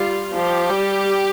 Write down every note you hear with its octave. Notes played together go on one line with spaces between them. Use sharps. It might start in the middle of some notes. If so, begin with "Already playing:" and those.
Already playing: G3 F4
F3 G4
G3